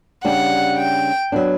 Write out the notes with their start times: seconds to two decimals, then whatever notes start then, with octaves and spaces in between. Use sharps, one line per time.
0.25 C#3 G3 D4 G4 F#5
0.78 G5
1.32 F#3 B3 D4